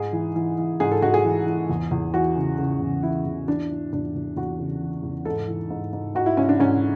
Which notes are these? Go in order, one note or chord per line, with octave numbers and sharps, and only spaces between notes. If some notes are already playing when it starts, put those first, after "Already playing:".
Already playing: G#2 G#4
E3
E3
E3
G#2 G#4
A4
G#2 F#4
G#4
E3
E3
E2
E2
E3 F#4
C#3
C#3
E2
E3 E4
E2
E3 D4
E3
E2 D4
E2
E2 F#4
C#3
E3
E2
G#2 A4
E3
G#2
G#2
G#2 F#4
E4
G#2 C#4
D4
G#2 C#4